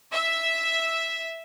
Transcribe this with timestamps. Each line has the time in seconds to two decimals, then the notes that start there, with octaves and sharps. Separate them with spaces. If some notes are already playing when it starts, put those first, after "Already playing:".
0.12 E5